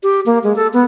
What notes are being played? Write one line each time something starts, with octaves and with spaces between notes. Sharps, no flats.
G4
A#3
G#3
A4
B3